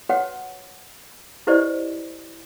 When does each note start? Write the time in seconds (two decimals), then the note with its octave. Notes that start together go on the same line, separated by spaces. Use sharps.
0.09 F#4 B4 C#5 F#5 G5
1.47 E4 G4 B4 C5 D5 D#5